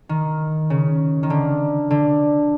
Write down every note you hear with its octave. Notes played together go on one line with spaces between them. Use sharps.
D#3
C#3
D#3
D3
D3